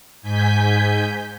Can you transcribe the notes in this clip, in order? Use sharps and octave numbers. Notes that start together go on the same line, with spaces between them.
G#2 G#5 G6 B6